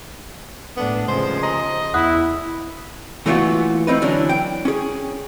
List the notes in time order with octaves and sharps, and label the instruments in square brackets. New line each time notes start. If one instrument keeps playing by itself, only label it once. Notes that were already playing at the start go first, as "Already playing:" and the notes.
[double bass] A2 A3 [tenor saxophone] B3 [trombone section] D4
[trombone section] D#2 F3 G#3 [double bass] C#3 [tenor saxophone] C5
[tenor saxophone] D#5 [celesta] A#5 C6
[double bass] E2 [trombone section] E4 [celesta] F#5 D#6 F#6
[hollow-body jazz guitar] A#2 E3 A3 B3 F4 F#4
A3 C4 D#4 B4
D3 E3 F#3 C#4 D4
G5
C#4 G#4